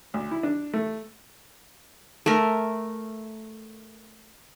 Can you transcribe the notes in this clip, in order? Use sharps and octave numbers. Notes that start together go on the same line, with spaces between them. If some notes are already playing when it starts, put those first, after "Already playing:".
D2
E4
D4
A3
A3 A#4